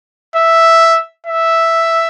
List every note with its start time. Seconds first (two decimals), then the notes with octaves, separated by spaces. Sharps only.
0.36 E5
1.26 E5